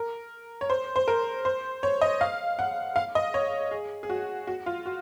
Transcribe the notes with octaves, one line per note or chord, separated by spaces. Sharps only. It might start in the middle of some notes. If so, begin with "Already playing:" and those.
Already playing: A#4
C#5
C5
C5
A#4
C5
C#5
D#5
F5
F#5
F5
D#5
C#5
G#4
G#4
F#4
F#4
F4
F#4